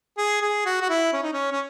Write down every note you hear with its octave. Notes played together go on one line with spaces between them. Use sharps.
G#4
G#4
F#4
F#4
E4
C#4
D#4
C#4
C#4